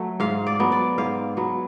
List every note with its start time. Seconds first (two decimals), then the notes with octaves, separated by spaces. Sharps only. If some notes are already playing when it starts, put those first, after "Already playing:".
Already playing: F#3 A3
0.20 G#2 F5
0.47 D5
0.59 F#3 B3
0.72 D5
0.98 G#2 F5
1.37 F#3 B3